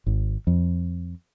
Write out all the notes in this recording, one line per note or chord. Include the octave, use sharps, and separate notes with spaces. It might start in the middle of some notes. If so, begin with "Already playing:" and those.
G#1
F2